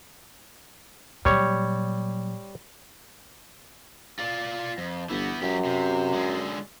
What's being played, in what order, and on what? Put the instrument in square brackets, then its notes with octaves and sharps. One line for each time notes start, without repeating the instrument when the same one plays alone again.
[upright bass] A#2 F#3 [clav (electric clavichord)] G3 C#5
[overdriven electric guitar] F4 D5
F2
[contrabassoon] G1 [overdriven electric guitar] E3 B3
[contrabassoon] F#2 [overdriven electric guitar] F#3 G4
[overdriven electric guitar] C3
D3 G#3